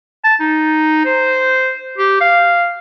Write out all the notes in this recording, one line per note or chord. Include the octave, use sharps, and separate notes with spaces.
A5
D#4
C5
G4
F5